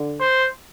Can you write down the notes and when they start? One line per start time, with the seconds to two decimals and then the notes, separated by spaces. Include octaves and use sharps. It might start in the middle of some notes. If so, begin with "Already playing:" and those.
Already playing: D3
0.20 C5